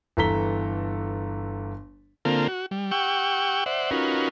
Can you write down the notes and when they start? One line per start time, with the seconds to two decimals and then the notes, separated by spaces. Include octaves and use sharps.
0.17 G1 E3 A4 A#5 B6 G7
2.25 D3 A#3 C4 F4 A4 A#4
2.48 F#4
2.71 G3
2.91 G4 F#5 G5 C#6 E6
3.66 C5 D5 E5 F#5
3.91 C#4 D#4 F4 F#4 A#4 B4